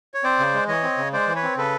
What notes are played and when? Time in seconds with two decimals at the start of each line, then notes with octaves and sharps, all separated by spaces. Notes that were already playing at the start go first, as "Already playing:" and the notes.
0.14 C#5
0.24 C4 C5 D5
0.39 C#3
0.54 G#3
0.68 E3 C#5 D#5
0.83 C4
0.98 C#3
1.13 G#3 C5 D5
1.28 E3
1.35 B4 C#5
1.43 C4
1.57 C#3 A4 B4